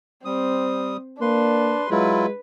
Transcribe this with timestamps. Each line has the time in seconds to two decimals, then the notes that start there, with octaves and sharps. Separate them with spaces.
0.25 G3 C4 D#6
1.21 A#3 D4 B4 C6
1.91 F#3 G#3 E4 F4 B4